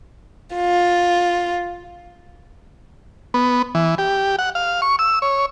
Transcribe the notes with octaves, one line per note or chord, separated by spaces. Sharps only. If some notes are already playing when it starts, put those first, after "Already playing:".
F4
B3
E3
G4
F#5
F5
C#6
E6
C#5